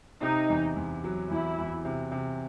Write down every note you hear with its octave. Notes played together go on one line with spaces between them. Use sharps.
C3 D#4
E2
E2
F#3
E2 E4
E2
C3
C3